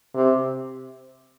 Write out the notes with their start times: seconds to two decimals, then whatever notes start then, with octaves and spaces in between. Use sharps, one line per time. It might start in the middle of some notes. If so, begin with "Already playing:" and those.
0.15 C3